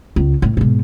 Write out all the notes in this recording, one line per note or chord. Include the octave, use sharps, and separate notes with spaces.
C#2
A2
G#2 B2